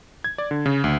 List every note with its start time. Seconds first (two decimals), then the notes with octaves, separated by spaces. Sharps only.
0.24 G#6
0.38 D5
0.51 D3
0.66 C#3
0.84 D2